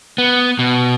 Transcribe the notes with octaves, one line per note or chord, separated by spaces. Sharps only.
B3
B2